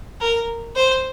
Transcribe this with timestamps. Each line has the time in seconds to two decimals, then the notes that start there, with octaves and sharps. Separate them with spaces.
0.21 A#4
0.76 C5